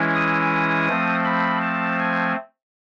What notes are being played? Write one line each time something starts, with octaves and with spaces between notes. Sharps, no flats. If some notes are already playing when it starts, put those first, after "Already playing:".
Already playing: E3 G#3 C#4 E4
D#6
F3 A3 C4
B5
A5
G#5